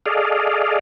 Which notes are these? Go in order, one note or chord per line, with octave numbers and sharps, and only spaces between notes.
G#4 A4 D5 D#5 F5